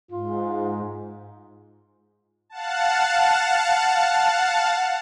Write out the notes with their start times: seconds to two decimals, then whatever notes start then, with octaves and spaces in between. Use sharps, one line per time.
0.11 G#2 F4
2.50 F5 F#5 A5